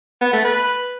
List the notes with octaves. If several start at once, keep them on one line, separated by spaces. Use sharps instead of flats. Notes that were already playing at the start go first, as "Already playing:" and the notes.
B3
A3
B4